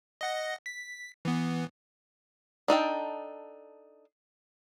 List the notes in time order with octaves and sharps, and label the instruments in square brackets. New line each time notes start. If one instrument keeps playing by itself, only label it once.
[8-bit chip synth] D#5 F#5 A#6
B6
E3 B3
[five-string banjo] D4 D#4 A4 G5